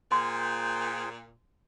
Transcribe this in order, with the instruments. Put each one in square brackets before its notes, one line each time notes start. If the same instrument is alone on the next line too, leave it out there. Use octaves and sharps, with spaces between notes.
[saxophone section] A#2 [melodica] G#4 C5 G5 [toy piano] C6